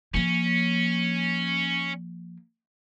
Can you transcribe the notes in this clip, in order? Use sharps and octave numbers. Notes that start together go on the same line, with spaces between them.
F3 A#3 C#4